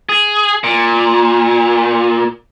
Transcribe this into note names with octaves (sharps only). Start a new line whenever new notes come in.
G#4
A#2